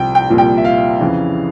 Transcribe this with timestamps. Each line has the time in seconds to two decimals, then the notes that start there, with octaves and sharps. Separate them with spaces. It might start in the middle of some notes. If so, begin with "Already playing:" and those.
Already playing: C2 C3 F3 G5
0.15 G5
0.29 C2 A#2 F3
0.38 G5
0.58 E5
0.65 F5
1.01 F2 C#3 E3